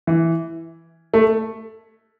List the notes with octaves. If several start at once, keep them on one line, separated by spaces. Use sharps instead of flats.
E3
A3